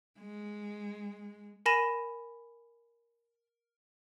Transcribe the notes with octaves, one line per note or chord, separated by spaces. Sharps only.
G#3
A#4 G#5 B5 A#6 D#7 E7